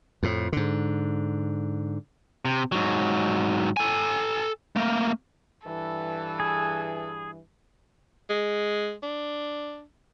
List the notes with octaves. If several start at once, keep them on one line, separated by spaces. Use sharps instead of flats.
F2 A2
G#2 D3
C3
G#2 F#3
A4 G#5
A3 A#3
G2 E3 A4
G#4
G#3
D4